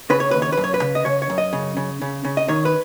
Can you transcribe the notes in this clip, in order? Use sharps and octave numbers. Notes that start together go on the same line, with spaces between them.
C#3 B4
C#5
D#2 B4
C#5
F#2 B4
C#5
B4
C#3
D#5
C#3 C#5
C#5
F#2
D#5
C#3
C#3
C#3
C#3
D#5
D#3 C#5
B4